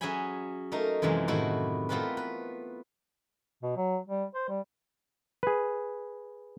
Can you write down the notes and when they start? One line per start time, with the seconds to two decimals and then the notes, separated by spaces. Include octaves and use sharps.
0.01 F#3 C#4 G#4 E5 G#5 B5
0.72 A3 A#3 D#4 A#4
1.02 F#2 C3 E3 F3 G#3
1.28 A2 D#3 E4 F#4 A4
1.89 A3 B3 C4 F4 A#4 B4
2.17 B4
3.62 B2
3.77 F#3
4.08 G3
4.35 C5
4.49 G3
5.43 G#4 B4